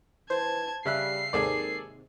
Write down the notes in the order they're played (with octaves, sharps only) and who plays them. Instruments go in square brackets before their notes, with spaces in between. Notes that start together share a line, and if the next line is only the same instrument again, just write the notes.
[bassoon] E3 [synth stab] C5 [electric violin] A5 G#6
[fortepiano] C#3 E5 F#6 [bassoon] G3 [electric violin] C7
[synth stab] D#2 G#2 C3 [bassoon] D#3 [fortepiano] G#4 A4 D5